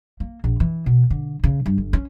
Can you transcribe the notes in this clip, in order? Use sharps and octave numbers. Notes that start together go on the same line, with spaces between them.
A#3
A#1
E3
B2
D3
C#3
G2
G1
C#4